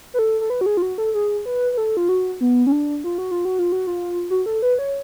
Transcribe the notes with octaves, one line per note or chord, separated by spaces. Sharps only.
B4
A4
A4
B4
F#4
G#4
F4
F#4
A4
G#4
B4
B4
A4
F4
F#4
B3
C#4
D4
F4
F#4
F4
F#4
F4
F#4
F4
F#4
A4
B4
C#5